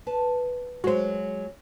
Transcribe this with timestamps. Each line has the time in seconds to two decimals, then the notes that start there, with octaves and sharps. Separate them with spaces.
0.07 B4 A5
0.84 F#3 G#3 F#4 C5